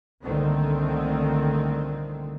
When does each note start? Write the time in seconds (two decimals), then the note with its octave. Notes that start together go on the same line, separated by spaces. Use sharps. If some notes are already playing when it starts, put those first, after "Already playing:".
0.23 C2 A#2 D3 D#3 A3 C4